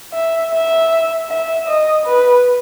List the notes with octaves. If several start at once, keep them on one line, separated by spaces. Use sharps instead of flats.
E5
E5
E5
D#5
B4